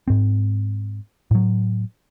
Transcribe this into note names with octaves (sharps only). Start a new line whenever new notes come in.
G#2 C4
A2 F#3